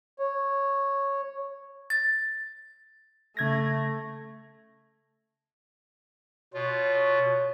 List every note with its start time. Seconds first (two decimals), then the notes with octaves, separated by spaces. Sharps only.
0.19 C#5
1.90 A6
3.37 C#3 A3 G#6 A#6
6.54 B2 F4 C#5